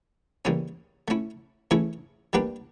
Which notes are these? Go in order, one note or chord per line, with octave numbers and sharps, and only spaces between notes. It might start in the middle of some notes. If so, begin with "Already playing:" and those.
C#3 E3 G3 A#3 C#4
A3 C#4 E4
E3 A3 C#4 E4 G#4
G3 A#3 D4 G4 B4